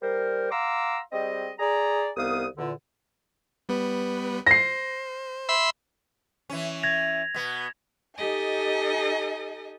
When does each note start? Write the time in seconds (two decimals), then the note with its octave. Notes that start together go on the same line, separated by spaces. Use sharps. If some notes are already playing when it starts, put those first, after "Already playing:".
0.02 G3 A#4 C5
0.51 F5 F#5 A#5 C6 D6 E6
1.12 G3 C4 G#4 D#5
1.59 G#4 D5 A#5
2.17 C2 D#3 B3 F5 D#6
2.58 E2 A#2 D3
3.69 G3 B3 B4
4.46 C5 A#6 C7
5.49 E5 B5 C6
6.50 E3 C#4
6.83 G#6 A#6 F7
7.34 B2 B3
8.16 D#4 G4 A4 D#5 G#5